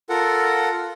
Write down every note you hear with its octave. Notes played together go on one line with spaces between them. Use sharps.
F4 A4 A#4 F#5